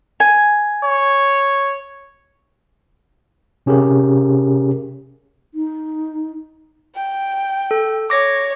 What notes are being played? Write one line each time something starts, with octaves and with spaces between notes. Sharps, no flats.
G#5
C#5
C3 C#4 G4 G#4 A#4
D#4
G5
A4
C#5 D6 A#6